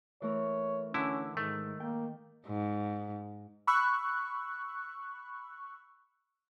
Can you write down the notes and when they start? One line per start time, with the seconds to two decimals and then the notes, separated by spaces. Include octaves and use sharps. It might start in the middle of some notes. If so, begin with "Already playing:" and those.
0.22 E3 A3 A#4 C#5
0.94 D3 C#4 E4
1.37 G#2 D#3 A3
1.80 A#3 G5
2.47 G#2
3.67 B5 C#6 E6 F#6